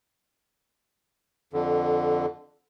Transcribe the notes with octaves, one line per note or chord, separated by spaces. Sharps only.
F2 D3